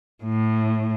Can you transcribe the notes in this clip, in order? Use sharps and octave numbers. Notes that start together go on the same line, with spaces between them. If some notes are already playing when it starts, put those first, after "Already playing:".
A2